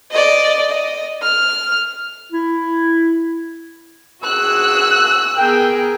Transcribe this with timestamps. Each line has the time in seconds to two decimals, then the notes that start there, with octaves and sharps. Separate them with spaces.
0.11 D5 D#5
0.71 D#5
1.22 F6
2.32 E4
4.24 F#4 G#4 E6 F#6
5.37 B3 G#4 A#4 G5